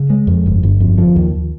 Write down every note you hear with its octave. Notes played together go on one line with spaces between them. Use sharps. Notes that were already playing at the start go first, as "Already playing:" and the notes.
Already playing: C#3
G#3
F2
G1
G1
F2
F3
D#2